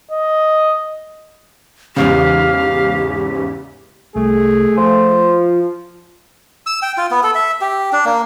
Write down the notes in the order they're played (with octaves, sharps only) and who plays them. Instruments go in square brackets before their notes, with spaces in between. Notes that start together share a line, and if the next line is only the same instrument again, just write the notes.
[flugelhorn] D#5
[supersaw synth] E2 G#2 C#3 [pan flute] G4 [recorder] F5
[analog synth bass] C2 [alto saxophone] A3 [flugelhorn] G#4
[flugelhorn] F3 [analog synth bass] F4 [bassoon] C5
[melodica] E6
G5
F4
B3
A4
E5
G4
D4
A#3